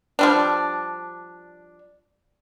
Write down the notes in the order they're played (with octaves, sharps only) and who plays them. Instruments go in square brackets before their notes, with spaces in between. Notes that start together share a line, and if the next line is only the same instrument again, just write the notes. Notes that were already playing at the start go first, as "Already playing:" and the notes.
[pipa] F3 G3 D4